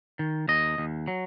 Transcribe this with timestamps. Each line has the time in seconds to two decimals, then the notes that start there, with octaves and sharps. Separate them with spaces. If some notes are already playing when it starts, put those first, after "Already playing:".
0.19 D#3
0.48 D#2 D#5
0.78 D#2
1.08 F#3